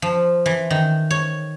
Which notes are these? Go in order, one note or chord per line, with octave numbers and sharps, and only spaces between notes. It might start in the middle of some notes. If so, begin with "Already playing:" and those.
F3
E3
D#3
C#5